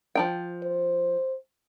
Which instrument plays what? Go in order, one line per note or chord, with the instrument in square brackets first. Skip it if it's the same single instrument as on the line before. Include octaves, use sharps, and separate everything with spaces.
[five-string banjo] F3 D#4 G5
[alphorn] C5